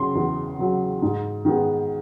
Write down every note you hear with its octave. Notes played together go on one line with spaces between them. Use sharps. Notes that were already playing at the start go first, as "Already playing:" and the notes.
Already playing: C#3 F#3 C6
E2
C#3 F#3
G#2
D#3 G#3 B3